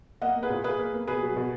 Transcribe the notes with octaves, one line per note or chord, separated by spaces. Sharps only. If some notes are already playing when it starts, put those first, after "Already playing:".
A#3 D#5 F#5
A#3
G#4 B4
A#2
A#2 G#4 B4
A#3
A#3
B2 G#4 B4
F#3
B2